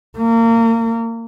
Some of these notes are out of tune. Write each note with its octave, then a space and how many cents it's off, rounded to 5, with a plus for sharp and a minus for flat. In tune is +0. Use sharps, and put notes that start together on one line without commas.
A#3 -30